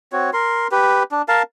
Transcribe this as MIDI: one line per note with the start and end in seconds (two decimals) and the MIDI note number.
0.13 0.30 60
0.13 0.30 66
0.13 0.30 73
0.33 0.67 70
0.33 0.67 84
0.72 1.03 67
0.72 1.03 71
1.12 1.22 62
1.28 1.42 70
1.28 1.42 77
1.28 1.42 81